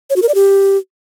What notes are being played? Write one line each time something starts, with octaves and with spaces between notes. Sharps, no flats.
C#5
F#4
A#4
D5
G4